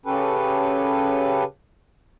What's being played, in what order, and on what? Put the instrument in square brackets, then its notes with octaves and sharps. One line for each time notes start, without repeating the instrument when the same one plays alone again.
[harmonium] C#3 C#4 G4 A4 B4